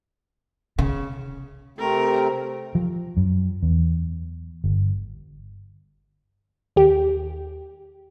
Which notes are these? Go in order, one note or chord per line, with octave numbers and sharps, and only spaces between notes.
C#3
C3 A3 C4 A#4
F3
F#2
E2
G1
D#2 G4